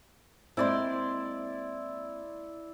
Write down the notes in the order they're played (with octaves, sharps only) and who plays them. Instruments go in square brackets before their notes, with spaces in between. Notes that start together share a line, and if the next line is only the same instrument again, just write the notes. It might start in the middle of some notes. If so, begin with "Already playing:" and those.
[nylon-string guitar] G#3 A#3 C4 [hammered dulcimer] E4 D5 C6